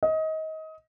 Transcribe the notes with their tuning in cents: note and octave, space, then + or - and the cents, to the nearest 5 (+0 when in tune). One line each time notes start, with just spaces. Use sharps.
D#5 +25